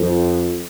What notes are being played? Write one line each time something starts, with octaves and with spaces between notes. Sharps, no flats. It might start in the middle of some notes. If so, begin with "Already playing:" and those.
Already playing: F2